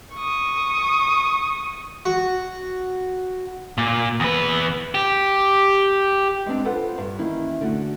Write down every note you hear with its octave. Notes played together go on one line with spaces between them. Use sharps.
C#6 D#6
F#4
A#2
E2 B4
G4
G#3 B3 C4 D4
F4 A4 B4 C5 F#5
G2
D#3 E3 A#3 C#4 E4
D3 A3 F#4